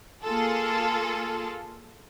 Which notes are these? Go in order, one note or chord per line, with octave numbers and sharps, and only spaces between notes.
A#3 F4 G#4 A4